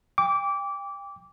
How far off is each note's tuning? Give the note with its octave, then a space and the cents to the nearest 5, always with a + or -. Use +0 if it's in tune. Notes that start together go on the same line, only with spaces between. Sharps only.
G5 +30 D6 -20